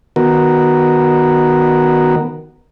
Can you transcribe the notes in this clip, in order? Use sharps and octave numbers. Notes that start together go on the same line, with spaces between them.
D#3 B3 F#4 A#4